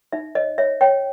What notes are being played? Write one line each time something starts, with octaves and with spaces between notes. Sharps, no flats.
D#4 E5
C#5 D#5
C#5 E5
C#5 G5